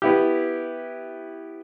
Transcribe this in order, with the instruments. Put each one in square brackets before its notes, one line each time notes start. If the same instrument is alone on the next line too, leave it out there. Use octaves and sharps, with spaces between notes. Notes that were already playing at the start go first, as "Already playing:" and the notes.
[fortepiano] B3 E4 G4